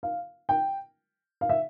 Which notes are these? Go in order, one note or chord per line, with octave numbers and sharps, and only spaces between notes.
F5
G5
F5
E5